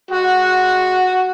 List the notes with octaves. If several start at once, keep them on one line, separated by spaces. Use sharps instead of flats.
G#3 F#4 F#5